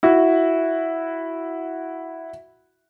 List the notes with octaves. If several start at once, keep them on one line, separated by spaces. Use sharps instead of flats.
E4 F#4